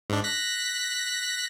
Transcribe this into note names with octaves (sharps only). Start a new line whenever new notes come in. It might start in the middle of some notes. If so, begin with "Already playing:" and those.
G#2 D4
F#6 A#6 B6